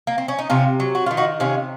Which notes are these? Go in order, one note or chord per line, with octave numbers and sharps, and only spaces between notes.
A#3
C4
C#4
D#4
C3 C#4 F4
F#3
F#4
D#3 F4
D#4 F#4
C3 C#4 F4